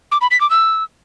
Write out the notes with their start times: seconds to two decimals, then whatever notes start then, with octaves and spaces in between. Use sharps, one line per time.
0.11 D6
0.21 B5
0.31 B6
0.40 D6
0.50 E6